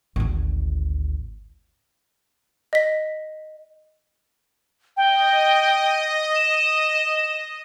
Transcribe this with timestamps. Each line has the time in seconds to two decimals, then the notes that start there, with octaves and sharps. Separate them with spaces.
0.16 G#1 D2
2.73 D#5 B6
4.97 D#5 G5
6.36 E7